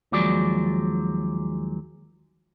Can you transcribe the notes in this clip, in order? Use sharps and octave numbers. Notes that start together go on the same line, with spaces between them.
D#2 F3 F#3 G#3 D5